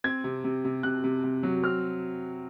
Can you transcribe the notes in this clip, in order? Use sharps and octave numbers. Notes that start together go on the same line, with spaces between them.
C4 G#6
C3
C3
C3
C3 F#6
C3
C3
F#3
C4 F6